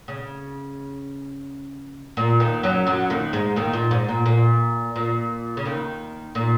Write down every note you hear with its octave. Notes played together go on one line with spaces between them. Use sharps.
C#3
A#2
D#2 D#3
F#2 F#3
F#2 F#3
D#2 D#3
G#2 G#3
D#2 D#3
A#2
G#2
A#2
A#2
A#2
C#3
D#2 D#3
A#2